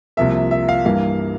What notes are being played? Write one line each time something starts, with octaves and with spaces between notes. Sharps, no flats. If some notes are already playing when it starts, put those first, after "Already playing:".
C2 C3 F3 A#3 E5
E5
F5
G2 E3 G3 A#3 F5